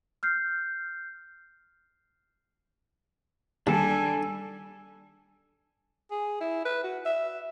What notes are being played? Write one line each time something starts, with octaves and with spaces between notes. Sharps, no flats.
F6 G6 C7
D#2 G3 D4 A4 G#5
G#4
E4
B4
F#4
E5